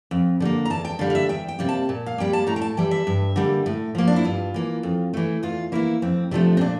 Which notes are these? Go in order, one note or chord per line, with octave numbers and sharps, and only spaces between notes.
F2
D3 G3
A#3
A#5
E2 A5
G5
D3 G3 A#3 F5
F5
E5
E2 G5
G5
C3 G3 A#3
A5
A#2
F5
G3 A#3 G5
A5
A2 A#5
G5
A5
E3 G3 G5
E5
G2
D3 G3 A#3
A2
F3 A#3
D4
E4
G2 F4
E3 A#3
F2
E3 A3
E2 F4
E3 A#3 E4
F2 C4
C3 F3 A3 D4
C4
A#2 D4